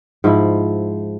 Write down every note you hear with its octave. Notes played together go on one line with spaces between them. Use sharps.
G#2 F3 E4